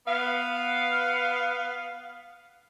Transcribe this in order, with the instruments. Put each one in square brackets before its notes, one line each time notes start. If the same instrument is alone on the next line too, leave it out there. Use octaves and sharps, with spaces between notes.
[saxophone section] B3 F5